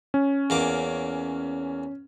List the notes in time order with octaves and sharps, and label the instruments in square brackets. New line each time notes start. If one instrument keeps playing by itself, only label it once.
[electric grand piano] C#4
[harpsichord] E2 A#3 D6